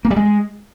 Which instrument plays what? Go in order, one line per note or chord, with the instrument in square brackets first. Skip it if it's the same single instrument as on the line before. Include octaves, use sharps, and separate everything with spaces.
[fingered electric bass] A#3
G3
G#3